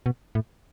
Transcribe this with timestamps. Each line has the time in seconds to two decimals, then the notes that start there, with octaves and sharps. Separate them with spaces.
0.06 B2
0.35 A2